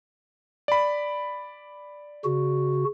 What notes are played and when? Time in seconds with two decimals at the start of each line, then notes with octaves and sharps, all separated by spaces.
0.68 D5 B5
2.24 C#3 F#4